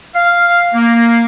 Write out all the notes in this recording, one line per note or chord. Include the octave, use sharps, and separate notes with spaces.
F5
A#3